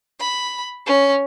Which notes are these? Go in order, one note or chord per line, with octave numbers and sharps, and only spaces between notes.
B5
C#4